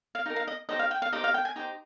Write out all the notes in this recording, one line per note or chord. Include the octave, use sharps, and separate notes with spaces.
F5
D#4 G4 A#4
F5
D#5
D#4 G4 C5 D#5
F5
G5
F5
D#4 G4 C5 D#5
F5
G5
G#5
D#4 G4 C5 G5